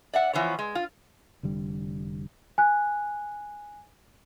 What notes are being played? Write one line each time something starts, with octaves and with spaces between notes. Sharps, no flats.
D5 E5 F#5
E3 F3 B3 C#5
G#3
F4
F1 D3 G3
G#5 F#6